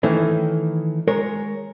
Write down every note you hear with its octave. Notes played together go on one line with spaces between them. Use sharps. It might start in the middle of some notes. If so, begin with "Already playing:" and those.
D#3 E3 A3 C#4
G#3 A#4 C#5